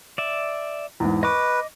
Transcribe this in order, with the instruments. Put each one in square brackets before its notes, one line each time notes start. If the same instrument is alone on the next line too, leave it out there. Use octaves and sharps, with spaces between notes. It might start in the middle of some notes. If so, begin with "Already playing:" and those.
[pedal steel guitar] D5 E5
[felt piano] E2 G#2
[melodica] B4 [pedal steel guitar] D#5 D6 [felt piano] C#6